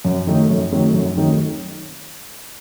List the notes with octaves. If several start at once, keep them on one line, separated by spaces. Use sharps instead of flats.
F#2
D#3 F#3 A3 D#4
F#2
D#3 F#3 A3 D#4
F#2
D#3 F#3 A3 D#4